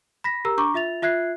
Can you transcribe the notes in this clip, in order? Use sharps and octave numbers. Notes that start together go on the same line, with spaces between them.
B5 A#6 B6
G4 A#4 A#5 E6
D4 A#5 C#6 D6
F4 E5 A6 F7
F4 E5 F#6 G#6 C7